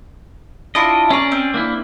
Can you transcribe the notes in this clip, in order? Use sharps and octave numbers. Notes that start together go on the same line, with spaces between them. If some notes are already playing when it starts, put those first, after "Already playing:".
D4 E4 F4 D#5
C#4 G#4 D5 A#5 C#6
C4
A#3 D4 E4